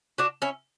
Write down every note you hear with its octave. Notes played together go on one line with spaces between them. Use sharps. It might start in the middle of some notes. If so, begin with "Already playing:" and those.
D4 F#4
C#4 E4